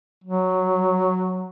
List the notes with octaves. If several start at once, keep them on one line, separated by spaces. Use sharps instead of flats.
F#3